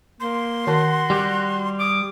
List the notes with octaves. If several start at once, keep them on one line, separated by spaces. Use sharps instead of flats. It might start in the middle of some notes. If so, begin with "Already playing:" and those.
A#3 C6
D#3 F#4 A#4 A5
G3 G4
D6 D#6